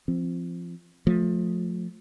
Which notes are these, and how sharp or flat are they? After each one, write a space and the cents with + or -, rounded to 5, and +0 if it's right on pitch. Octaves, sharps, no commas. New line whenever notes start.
F3 -20 C4 +0
F3 +25 A3 +0